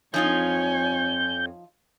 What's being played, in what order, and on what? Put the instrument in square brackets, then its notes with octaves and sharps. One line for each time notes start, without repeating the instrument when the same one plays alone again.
[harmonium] F2 [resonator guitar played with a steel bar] F3 D#4 F4 [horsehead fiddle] C#5 G#5 [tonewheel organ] G6